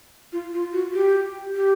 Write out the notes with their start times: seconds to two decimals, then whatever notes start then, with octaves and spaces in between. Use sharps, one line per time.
0.33 F4
0.53 F4
0.73 F#4
0.94 G4
1.55 G4